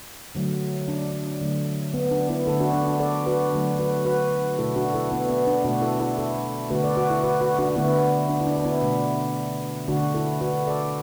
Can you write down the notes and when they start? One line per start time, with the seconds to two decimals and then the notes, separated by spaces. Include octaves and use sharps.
0.35 D3 F#3 A3
0.88 D4
1.41 D3 F#3 A3
1.94 B3
2.11 D4
2.29 B3 E4
2.47 D3 A3 E4 A4
2.60 D4 F#4
2.73 D4
2.87 D4
3.00 A4 D5
3.26 F#4 B4
3.53 D3 F#3 A3
3.79 F#4 B4
4.05 F#4 B4
4.58 B2 A3 E4 A4
4.76 D4 F#4
4.94 E4 A4
5.12 B3 E4
5.29 B3
5.47 D4
5.64 B2 A3 D4 F#4
5.82 E4 A4
6.00 E4 A4
6.18 E4 A4
6.70 D3 A3 F#4 B4
6.83 A4 D5
6.97 F#4 B4
7.10 E4 A4
7.23 F#4 B4
7.41 F#4 B4
7.59 D4 F#4
7.69 F#4
7.76 D3 A3 B3 E4
8.29 D4
8.41 E4
8.47 D4
8.57 D4
8.65 B3 E4
8.82 B2 A3
9.88 D3 A3 D4 F#4
10.14 E4 A4
10.41 F#4 B4
10.67 A4 D5